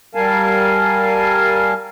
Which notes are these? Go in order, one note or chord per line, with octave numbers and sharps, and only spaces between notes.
G3 A#4 F5 G#5 A5